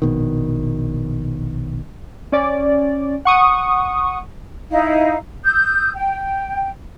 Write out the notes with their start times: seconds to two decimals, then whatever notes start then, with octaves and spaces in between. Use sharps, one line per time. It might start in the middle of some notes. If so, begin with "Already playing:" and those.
0.02 A#1 B2 D#3
2.32 C#4 D5
3.25 F#5 C#6 D#6
4.70 D#4 E4 F5
5.43 D#6 E6 G6
5.93 G5